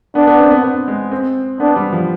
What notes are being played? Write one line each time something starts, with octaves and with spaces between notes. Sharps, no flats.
B3 D4
B3
C4
B3
B3
G#3
C4
B3 D4
G3
F3